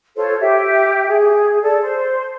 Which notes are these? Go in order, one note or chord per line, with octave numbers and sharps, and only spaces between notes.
F4 A4 C5 C#5
G4 E5
G#4
A4 D5
C5